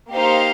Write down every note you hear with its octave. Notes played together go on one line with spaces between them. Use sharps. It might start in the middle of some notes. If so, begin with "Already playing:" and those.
A#3 D#4 G4 C5 F5